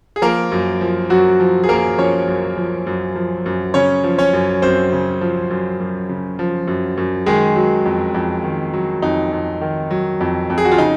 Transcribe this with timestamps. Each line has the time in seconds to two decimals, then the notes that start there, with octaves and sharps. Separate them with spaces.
0.16 G#4
0.22 F3 A#3 A#4
0.52 F#2
0.81 F3
1.10 F#2 F#3 F#4
1.40 F3
1.64 G#4
1.69 F#2 A#3 A#4
1.98 F3 C#4 C#5
2.27 F#2
2.57 F3
2.86 F#2
3.16 F3
3.46 F#2
3.74 C#3 C#4 C#5
4.04 F3
4.18 C#4 C#5
4.33 F#2
4.62 F#2 C4 C5
4.92 C#3
5.21 F3
5.50 F#2
5.80 F#2
6.09 C#3
6.39 F3
6.67 F#2
6.97 F#2
7.26 D#3 G#3 G#4
7.56 F#3
7.85 F2
8.14 F2
8.44 D#3
8.73 F#3
9.02 F2 D#4
9.33 F2
9.61 D#3
9.91 F#3
10.21 F2
10.50 F2
10.58 G#4
10.65 F#4
10.72 F4
10.78 C#3 D#4